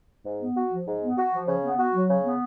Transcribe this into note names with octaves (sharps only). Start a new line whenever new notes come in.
G#2
B3
F#4
F3
G#2
B3
F#4
F3
C#3
B3
F#4
F#3
C#3
B3